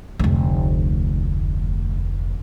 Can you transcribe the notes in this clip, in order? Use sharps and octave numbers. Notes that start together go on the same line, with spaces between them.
F1 D2